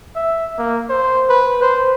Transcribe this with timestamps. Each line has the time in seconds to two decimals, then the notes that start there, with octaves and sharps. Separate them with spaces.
0.15 E5
0.58 A#3
0.89 C5
1.29 B4
1.62 C5